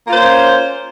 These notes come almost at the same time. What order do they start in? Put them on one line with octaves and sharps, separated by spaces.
A#3 F4 C5 C#4